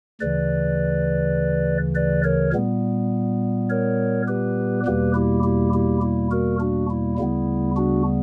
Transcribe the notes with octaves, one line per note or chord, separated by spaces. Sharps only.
D2 C#3 E3 B4 D5
B4 D5
A#4 C#5
A#2 G3 B3
A#4 C#5
G4 B4
E2 B2 G3 A#3 G4 B4
E4 G4
E4 G4
E4 G4
E4
F#4 A#4
D4 F#4
E4
D2 C#3 G3 B3 E4
D4 F#4